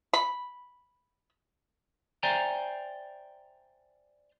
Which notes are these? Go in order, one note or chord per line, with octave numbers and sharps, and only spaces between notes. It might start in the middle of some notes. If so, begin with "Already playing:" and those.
B5
C5 D5 E5 G5 G#5 A#5